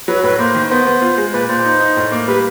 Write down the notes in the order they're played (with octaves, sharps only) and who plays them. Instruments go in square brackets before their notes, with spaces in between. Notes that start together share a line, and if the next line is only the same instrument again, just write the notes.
[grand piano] F#3 [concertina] B4
[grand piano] A2 [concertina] B4
[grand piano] A#3 [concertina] C5
[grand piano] D#3
[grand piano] B3 [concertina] C5
[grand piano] B3
F4
G#3
[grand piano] A#2 [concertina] B4
[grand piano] A#2 [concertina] C5
[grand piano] D#4
D#4
A2
A#3
[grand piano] G3 [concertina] B4